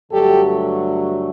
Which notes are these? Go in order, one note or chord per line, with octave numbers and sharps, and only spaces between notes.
G2 D3 F#3 A3 G4 A4